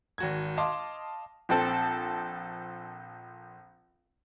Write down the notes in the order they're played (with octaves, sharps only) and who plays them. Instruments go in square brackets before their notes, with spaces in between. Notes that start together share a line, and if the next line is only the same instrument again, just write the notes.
[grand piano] G#1 F#4 G#6
D#5 F5 A5 C6 D6
[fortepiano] A#1 C4 A4